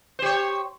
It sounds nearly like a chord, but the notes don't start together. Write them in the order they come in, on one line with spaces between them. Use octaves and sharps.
C5 G4 C#5